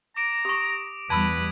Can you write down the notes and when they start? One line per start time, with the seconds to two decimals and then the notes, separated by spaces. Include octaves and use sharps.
0.16 A#5 D6 A#6 D7
0.45 G4 C#6 D#6
1.10 E2 G3 B4 A5 B5 E6 G#6 F#7